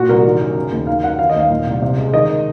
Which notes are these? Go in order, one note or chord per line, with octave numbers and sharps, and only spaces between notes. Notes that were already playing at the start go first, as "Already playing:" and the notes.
Already playing: A#2 F#4
C2 A#4
D#3
F#2
C#3
D#2
D#3 F5
F#2 F#5
D#3 F5
D#5
D#2
F5
A#2
C2
C3
C#2
D#3 D#5